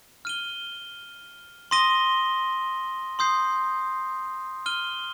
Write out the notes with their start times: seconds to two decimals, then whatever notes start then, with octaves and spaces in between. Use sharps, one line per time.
0.25 F6 D#7 G7
1.71 C6 D#6 A#6 D#7 G7
3.19 C6 D#6 G6 C7
4.66 F6 D#7 G7